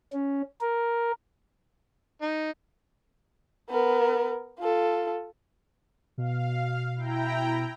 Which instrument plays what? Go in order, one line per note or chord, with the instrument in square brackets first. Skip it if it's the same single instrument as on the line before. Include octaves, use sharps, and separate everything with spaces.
[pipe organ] C#4
A#4
[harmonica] D#4
[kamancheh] B3 A#4
F4 A4
[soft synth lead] B2 [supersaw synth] F5
[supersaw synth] E4 G5 A#5